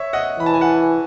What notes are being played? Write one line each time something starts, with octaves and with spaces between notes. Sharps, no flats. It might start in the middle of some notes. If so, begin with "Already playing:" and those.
Already playing: C#5 E5
D#5 F#5
E3 B5
A5
G#5
F#5 A5